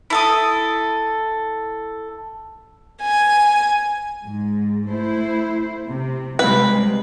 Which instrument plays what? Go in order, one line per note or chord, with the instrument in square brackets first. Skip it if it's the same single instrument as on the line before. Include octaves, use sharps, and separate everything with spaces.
[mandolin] E4 A4 D#6
[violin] G#5
[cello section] G#2
A3 E4 C5
C3
[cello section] C3 G3 G#3 [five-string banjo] B4